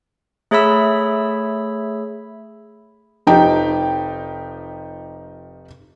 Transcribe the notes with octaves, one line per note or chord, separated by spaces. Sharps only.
A3 G#4 C#5 E5 B5 E6
F1 F3 D#4 G4 G5